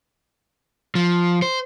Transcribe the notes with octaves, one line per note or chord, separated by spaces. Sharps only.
F3
C5